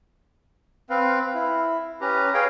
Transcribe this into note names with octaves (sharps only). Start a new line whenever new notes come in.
C4 B4 F5
E4
C#4 G4 B4 A#5
C#4 G#4 B4 C#5 F5 G5